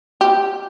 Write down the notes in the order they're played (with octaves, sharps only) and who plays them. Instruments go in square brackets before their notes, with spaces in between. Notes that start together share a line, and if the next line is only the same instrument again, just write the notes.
[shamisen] G4